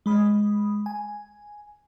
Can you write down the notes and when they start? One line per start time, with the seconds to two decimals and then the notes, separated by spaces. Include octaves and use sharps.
0.06 G#3 B5 D#6
0.86 G#5